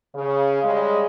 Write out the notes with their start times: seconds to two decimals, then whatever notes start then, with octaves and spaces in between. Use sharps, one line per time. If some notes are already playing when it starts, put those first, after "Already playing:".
0.15 C#3
0.63 C#3 G3 G#3